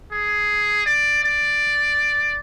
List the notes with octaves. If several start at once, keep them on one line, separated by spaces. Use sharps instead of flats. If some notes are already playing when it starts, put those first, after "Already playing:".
G#4
D5
D5